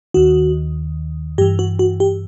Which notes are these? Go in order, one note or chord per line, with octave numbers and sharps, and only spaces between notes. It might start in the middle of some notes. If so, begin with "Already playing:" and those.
D#2 D#3 F#4
G2 E3 G4
F#4
F#4
G4